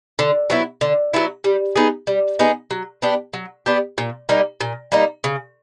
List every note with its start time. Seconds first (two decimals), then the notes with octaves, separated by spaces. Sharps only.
0.19 D3
0.50 F#3 B3 E4
0.81 D3
1.13 F#3 B3 E4
1.44 G3
1.76 B3 D#4 G#4
2.07 G3
2.39 B3 D#4 G#4
2.71 F#3
3.02 B3 D4 G4
3.33 F#3
3.66 B3 D4 G4
3.98 A#2
4.29 G3 A#3 D#4
4.61 A#2
4.92 G3 A#3 D#4
5.24 C#3